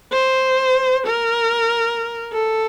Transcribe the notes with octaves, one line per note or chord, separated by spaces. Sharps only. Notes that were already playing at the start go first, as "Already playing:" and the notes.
C5
A#4
A4